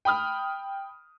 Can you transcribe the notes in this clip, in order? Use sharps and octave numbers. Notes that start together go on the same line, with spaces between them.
G5 B5 D#6 F6